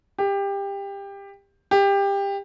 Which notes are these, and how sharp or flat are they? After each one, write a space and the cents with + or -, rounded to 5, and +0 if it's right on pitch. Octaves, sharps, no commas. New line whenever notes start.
G4 +20
G4 +20